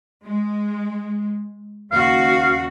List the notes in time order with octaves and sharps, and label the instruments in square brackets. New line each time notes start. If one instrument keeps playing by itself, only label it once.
[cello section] G#3
[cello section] D#2 C#3 F#4 [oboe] F5